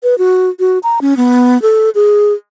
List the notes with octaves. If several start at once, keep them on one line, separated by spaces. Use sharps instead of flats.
B4
F#4
F#4
A#5
C#4
B3
A4
G#4